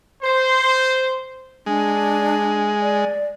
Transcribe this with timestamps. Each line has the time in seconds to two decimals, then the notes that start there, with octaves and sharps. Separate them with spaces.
0.23 C5
1.66 G#3 D4
2.81 D5